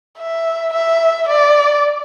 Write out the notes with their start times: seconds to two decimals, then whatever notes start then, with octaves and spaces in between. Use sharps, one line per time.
0.18 E5
0.73 E5
1.28 D5